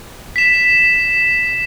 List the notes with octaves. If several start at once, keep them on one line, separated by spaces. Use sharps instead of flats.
B6 E7